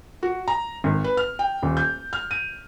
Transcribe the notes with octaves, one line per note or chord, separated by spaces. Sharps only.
F#4
A#5
G#1
B4
F6
G5
D#1
G6
F6
D#7